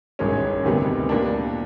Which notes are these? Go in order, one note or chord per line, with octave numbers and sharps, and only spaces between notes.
A1 G2 D#3 G#3 C#4
D2 C3 D#3 G3 B3
A#2 G3 A#3 D4